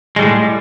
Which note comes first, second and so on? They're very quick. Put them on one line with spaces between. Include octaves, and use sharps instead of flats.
G#3 G3 A2